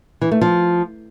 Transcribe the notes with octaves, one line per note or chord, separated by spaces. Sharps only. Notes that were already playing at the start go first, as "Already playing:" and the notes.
E3
A3
F3